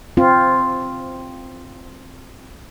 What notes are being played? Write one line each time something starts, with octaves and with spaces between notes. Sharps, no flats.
C4 F4